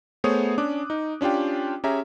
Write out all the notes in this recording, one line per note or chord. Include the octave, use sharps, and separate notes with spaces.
A3 B3 G#4 C5 C#5 D#6
C#4 D4 D6 F#6
D#4
C#4 D4 F4 G4 G5
C#4 G4 G#4 E5 A#5